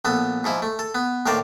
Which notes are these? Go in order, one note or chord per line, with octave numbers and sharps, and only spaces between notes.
A#1 B3 A4
G#2 F3 E4
A3
A4
B3
D#2 A2 A#4 C5 D5